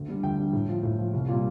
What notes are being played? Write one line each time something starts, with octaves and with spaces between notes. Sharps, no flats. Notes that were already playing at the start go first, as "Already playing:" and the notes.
Already playing: D2
D3 G3
D2 G5
D3 G3
A2
F3
A2
F3
C2
A#2 G3